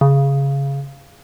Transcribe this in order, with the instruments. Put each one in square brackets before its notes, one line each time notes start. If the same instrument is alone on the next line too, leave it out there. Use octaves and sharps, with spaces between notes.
[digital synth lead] C#3